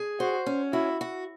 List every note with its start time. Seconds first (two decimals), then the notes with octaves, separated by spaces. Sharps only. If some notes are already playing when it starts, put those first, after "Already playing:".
Already playing: G#4
0.20 F#4 C5
0.46 C#4
0.73 E4 F#4
1.01 F#4